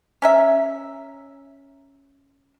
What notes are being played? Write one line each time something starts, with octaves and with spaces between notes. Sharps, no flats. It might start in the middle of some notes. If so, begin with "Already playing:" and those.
C#4 A#4 E5